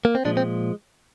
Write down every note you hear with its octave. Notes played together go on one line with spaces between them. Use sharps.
A#3
C4
A#2 F3 G#3 D4
C4